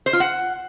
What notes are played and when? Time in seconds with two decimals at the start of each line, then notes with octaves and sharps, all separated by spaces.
0.06 C5
0.13 F4
0.20 F#5